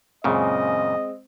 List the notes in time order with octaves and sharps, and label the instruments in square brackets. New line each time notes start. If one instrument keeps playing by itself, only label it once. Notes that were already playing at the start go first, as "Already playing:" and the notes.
[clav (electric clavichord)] F#2 A#2 C#3 [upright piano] G#3 C4 [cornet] D#5